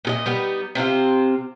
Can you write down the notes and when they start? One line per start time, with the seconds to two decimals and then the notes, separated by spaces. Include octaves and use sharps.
0.05 A#2 G#4 D#5
0.26 G3 B3 D#4
0.75 C3 C4 E4 F4